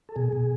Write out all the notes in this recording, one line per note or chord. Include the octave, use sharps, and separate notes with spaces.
A4
B2 G#4
B2